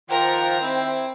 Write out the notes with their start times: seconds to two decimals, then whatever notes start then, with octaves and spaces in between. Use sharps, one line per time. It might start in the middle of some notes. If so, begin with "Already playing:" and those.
0.10 D#3 F3 F4 A#4 C5 F#5 G5 A#5
0.61 C4 E4